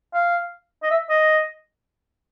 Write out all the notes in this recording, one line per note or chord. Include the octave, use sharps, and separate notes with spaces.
F5
D#5
E5
D#5